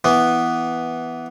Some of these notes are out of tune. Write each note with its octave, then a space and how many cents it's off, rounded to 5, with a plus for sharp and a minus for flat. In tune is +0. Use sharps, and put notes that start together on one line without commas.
E3 +0 B3 +0